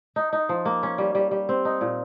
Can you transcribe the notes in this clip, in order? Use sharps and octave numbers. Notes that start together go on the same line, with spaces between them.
D#4
D#4
F3
A#3
C#4
G3
G3
G3
C4
D#4
A#2